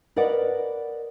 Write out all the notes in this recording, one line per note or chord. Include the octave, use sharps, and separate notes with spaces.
A#4 B4 D5 D#5 F#5